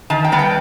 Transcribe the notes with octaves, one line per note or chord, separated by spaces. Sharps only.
D#3 A5
G5
G3 B3
G5